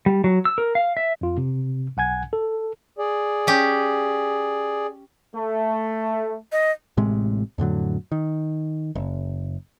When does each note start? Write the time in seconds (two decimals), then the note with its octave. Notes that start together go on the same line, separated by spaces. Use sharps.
0.06 G3
0.24 F#3
0.45 E6
0.58 A#4
0.75 F5
0.97 E5
1.21 F2 F4
1.38 C3
1.97 B1 F#5 G#5 G#6
2.33 A4
2.98 G#4 D5
3.47 C#4 G4
5.35 A3
6.52 D#5
6.97 A1 A2 C3 G#3
7.58 F2 A2 D3 F#3
8.12 D#3
8.95 F#1